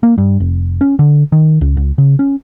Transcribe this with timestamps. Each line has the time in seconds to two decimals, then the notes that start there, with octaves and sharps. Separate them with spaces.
0.03 A#3
0.18 G2
0.40 F1
0.81 C#4
0.99 D3
1.32 D#3
1.61 C#2
1.77 C#2
1.98 C#3
2.19 C#4